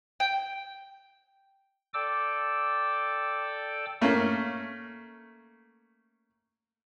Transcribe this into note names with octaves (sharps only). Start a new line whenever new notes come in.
G5
A4 D5 G5 D6 E6
A3 A#3 C#4